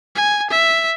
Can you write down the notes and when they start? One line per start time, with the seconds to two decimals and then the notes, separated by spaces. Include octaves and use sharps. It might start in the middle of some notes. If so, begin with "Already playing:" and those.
0.16 G#5
0.50 E5